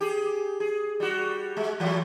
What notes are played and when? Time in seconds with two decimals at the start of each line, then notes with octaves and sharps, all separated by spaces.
0.01 G4 G#4
0.60 G#4
1.00 G3 F#4
1.57 G#3
1.80 E3 F#3 A3